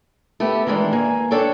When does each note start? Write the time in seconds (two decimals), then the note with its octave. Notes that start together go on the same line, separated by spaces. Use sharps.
0.40 A3 B3 G4
0.67 D#3 E3 G#3 D4
0.93 A#3 G#5
1.31 D4 A4 C#5 G5